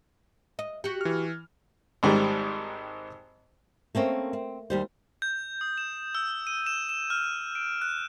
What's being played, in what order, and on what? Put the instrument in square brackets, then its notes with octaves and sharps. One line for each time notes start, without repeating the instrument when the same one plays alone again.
[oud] D#5
F#4 G4
[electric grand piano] E3 F6
[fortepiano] G#1 G#2 D#3 G3
[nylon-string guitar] A3 A#3 C4 C#4
C4
D#2 G3 C5
[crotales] G6
D#6
E7
E6
D#7
E7
E7
F6
D7
F#6